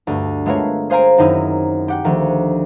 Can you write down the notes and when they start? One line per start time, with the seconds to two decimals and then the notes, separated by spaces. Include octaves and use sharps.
0.07 D2 G2
0.46 G#3 A3 B3 F4 A#4 C#5
0.90 G#4 C5 F5 G#5 A#5 D7
1.18 F#2 D#3 C4 D#4 E4
1.88 G4 F#5 G5
2.04 D2 D#3 F3